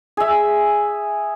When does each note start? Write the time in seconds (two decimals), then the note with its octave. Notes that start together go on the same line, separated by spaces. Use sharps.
0.17 G#4 E5